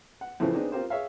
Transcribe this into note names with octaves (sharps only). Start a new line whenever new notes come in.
F#5
F2 A2 C#3 E3 A3 C4
B3 C4 D4 D#4 G#4
C4 F4 G4 A#4 C5
G#4 C#5 E5 F5